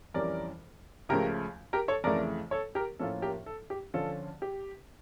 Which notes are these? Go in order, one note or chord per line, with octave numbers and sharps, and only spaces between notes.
F2 E3 G3 C#4 A#4 D5
C#2 C#3 F3 A3 G4 A#4
G4 A#4
A4 C#5
F2 C#3 E3 A3 A#4 D5
A4 C#5
G4 A#4
A2 F3 A#3 C#4 F4 A4
G4 A#4
A4
G4
D3 F3 C#4 F4 A4
G4